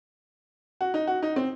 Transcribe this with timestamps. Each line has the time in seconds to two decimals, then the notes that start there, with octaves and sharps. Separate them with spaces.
0.81 F#4
0.94 D#4
1.07 F#4
1.23 D#4
1.36 C4